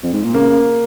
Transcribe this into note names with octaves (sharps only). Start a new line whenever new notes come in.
F2
G#2
A#2
C#3 A#3